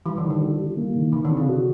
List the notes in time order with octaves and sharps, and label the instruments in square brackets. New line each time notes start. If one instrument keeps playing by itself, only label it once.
[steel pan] E3 [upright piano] G3
[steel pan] D3
[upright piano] D#3
[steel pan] D3
[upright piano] G3
G3
A#3
D#3
[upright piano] D#3 [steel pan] E3
[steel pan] D3
[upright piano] C3
[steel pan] C#3
[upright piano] F#4